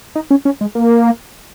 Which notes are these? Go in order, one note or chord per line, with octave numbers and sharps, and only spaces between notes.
D#4
C#4
C#4
G#3
A#3